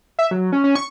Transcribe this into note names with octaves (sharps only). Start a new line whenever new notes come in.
E5
F#3
C#4
C#4
C#6